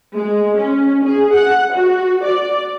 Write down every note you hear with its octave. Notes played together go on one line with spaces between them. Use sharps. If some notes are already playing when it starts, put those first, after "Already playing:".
G#3
C#4
G#4
F#5
F#4
D5